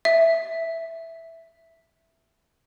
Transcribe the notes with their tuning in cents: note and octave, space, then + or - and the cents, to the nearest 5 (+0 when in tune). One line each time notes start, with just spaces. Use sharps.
E5 +0